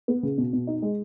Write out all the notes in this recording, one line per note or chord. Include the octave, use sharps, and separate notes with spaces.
B3
C#3
B2
B2
D#4
G#3